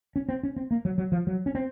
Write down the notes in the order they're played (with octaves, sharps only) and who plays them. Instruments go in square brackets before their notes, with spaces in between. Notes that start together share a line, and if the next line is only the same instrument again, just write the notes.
[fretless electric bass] C#4
C4
C#4
C4
A#3
F#3
F#3
F3
F#3
C#4
C4